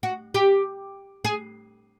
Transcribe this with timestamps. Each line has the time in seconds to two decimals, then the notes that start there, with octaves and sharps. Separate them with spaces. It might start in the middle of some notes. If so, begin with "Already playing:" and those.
0.03 F#4
0.34 G4
1.25 G#4